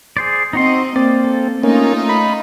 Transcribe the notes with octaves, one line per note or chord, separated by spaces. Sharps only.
G#4 C5 D5
C4 D#4 F#4 D#5 C6
A#3 C4 D5
A4
A3 A#3 C#4 D#4 F4
B5